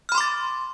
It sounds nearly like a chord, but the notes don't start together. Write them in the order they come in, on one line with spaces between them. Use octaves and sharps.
F6 B5 C6 D6 A6